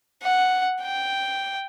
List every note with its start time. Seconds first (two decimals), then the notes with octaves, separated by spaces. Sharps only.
0.23 F#5
0.82 G5